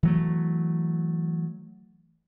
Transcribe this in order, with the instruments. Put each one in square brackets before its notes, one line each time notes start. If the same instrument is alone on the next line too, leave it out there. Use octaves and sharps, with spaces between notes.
[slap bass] E3 F#3 A3